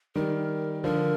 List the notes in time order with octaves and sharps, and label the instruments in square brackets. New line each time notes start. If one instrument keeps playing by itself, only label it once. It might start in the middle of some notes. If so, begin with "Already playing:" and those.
[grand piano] D#3 G3 [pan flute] A#4
[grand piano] D3 F3 [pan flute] A#4